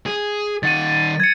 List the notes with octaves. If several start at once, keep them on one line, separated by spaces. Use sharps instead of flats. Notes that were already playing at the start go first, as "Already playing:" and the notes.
G#4
D#3 F#5 A6 D#7
G#6 C#7